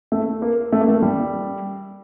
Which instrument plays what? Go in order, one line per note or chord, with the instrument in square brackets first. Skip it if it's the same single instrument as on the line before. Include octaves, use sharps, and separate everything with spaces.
[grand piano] A3
A#3
A3
A#3
A3
G3